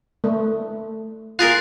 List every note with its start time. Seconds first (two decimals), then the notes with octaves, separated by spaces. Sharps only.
0.24 A3
1.39 F4 G#4 A#4 F#6 A6